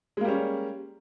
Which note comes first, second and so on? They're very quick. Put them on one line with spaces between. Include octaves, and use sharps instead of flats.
G#3 A#3 G3 C#4